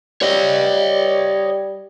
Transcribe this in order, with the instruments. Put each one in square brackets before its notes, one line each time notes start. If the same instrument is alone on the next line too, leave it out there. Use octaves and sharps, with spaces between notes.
[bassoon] G3 [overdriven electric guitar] C#5 D#5